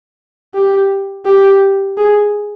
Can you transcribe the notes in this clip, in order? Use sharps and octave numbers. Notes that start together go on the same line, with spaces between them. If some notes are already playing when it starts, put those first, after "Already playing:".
G4
G4
G#4